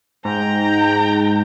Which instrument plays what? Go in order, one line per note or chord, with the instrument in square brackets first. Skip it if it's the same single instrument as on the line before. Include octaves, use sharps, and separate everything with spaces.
[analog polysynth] G#2 [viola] G5 A#5